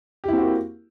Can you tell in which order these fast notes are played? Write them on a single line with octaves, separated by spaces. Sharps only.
G4 E4 C4 F#4 A#3